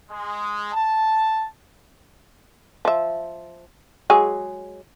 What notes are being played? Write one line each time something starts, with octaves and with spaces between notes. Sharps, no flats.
G#3
A5
F3 E5
F#3 G#3 G#4